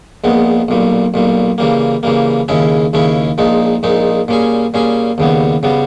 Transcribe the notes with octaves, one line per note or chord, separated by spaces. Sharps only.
A#1 A#2 G#3 B3
B1 A#2 G3
B1 A#2 G3
C#3 E3 G3 A#3
C#3 E3 G3 A#3
D#2 C#3 G#3 C#4 E4
D#2 C#3 G#3 C#4 E4
A#1 A#2 G#3 D#4
A#1 A#2 G#3 D#4
A#2 G3 C#4 G#4
A#2 G3 C#4 G#4
D#2 C#3 G3 B3
C#3 G3 B3